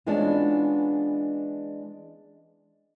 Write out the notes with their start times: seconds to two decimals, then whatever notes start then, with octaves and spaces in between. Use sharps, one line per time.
0.06 E3 G#3 B3 C#4 D4 F4